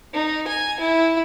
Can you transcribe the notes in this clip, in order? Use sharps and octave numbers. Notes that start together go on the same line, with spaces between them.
D#4
G#5
E4